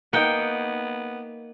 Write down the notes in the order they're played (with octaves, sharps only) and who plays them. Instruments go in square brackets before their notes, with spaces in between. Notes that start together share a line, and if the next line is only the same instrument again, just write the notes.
[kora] A#3 D#4 [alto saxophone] B3 [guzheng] F#5 G5